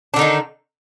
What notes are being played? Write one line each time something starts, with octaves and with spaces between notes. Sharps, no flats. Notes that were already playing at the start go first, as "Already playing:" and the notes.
D3 D#3 D4 D#4